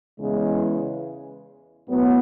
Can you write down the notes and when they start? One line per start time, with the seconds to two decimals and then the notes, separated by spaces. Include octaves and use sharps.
0.19 E2 C#3 E3 G#3
1.88 A2 F#3 B3